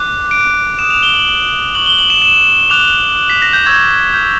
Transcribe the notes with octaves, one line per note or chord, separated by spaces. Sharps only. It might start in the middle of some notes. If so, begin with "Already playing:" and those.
Already playing: D6 F#6
D7
D#6 F#6 E7
F7
G7
F#7
C#6 F#6 F#7
G7
F#7
E7
E7
D6 F#6 F7
B6
A#6
G6
C#6 E6 G6 G#6
G6